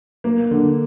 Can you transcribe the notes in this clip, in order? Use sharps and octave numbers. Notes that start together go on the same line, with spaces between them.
A#3
D3